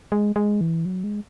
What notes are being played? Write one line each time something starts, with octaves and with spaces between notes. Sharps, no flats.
G#3
G#3
E3
F#3
G#3